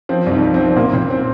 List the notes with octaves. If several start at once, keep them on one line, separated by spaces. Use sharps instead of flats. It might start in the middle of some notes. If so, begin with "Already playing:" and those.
F3 C4
C2
D#4
F3
C4
F3
A#2 A#3
A#2 C4
C4